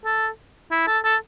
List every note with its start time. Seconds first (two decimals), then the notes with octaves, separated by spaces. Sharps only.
0.05 A4
0.71 E4
0.87 A4
1.04 A4